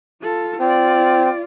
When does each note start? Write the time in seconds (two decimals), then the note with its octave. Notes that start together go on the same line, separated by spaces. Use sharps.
0.22 F4 A4
0.60 C4 F4 D5